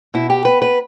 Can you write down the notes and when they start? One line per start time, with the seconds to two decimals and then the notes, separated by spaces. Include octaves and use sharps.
0.14 B2 E4
0.30 G4
0.45 B3 B4
0.62 B4